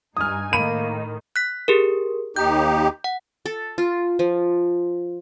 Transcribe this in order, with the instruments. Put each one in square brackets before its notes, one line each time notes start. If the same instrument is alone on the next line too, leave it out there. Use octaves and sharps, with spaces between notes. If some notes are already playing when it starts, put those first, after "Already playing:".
[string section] G2 D#4 G#5 [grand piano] D#6 F6
[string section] A2 D#3 [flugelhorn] A#3 [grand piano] B5 [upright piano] D#7
[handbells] F#6 B6
G4 G#4 A#4
[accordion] D#2 D#4 G4 [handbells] G6
[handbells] F#5
[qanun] A4
F4
F3